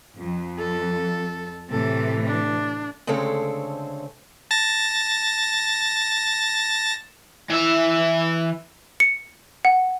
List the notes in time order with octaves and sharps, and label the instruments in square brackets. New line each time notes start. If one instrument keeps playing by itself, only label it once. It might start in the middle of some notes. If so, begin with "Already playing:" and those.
[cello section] F2
[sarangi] A4
[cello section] A2 C3 E3 [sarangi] A4
[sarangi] D4
[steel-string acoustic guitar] D2 C#3 G#3 C4 A4 C#5
[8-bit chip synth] A5 A6 A#6
[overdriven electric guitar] E3 E5
[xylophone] C#7
F#5